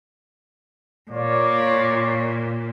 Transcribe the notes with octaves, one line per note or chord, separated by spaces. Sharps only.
A#2 F4 C#5 D5